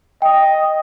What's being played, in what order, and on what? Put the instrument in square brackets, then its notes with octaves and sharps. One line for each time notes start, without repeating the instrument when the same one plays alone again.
[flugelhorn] D#5 [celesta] G5